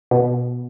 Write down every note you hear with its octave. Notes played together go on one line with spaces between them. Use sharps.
B2